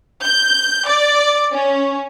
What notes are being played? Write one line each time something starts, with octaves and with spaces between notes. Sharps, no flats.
G6
D5
C#4